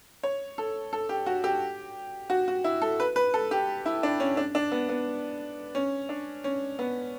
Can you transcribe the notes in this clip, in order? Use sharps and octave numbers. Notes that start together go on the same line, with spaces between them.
C#5
A4
A4
G4
F#4
G4
F#4
F#4
E4
A4
B4
B4
A4
G4
E4
D4
C#4
D4
D4
B3
B3
C#4
D4
C#4
B3